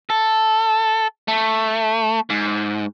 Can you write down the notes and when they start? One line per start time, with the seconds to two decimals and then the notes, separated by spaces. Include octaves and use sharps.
0.10 A4
1.28 A3
2.30 G#2